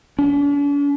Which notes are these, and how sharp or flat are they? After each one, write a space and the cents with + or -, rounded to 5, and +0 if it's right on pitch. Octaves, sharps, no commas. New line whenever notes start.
D4 -45